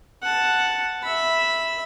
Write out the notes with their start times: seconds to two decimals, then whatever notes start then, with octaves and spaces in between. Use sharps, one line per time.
0.23 F#5 A5
1.03 E5 B5